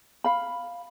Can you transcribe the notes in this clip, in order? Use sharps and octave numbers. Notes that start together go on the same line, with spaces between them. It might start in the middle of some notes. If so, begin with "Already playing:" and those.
F5 B5